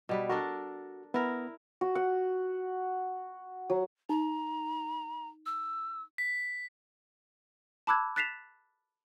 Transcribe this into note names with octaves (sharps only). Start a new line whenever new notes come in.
B2 G3 B4
D4 F#4 A4 A#4
B3 E4 A#4 F6
F#4
F#5
F#3
D#4 A#5
E6
B6
A5 B5 D6 E6 F#6 G#6
F#6 A6 B6 C7 E7 F7